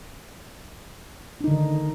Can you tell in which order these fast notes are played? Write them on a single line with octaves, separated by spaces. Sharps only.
D4 D#4 D3 D#3